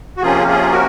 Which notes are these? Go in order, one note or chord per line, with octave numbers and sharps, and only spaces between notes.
F#4
C3 F3 A#3 C#4 F4 G#4
F4 G#4
F#4 A#4